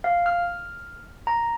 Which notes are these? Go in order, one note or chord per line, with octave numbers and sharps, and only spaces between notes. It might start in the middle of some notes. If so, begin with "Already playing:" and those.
F5
F6
A#5